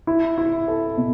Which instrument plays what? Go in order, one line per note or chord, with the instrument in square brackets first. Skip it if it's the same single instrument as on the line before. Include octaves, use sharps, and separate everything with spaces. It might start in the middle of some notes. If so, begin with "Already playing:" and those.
[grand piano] E4
E4
A4
B2